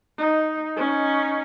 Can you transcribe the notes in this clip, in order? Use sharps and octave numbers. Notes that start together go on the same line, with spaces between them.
D#4
C#4 D#4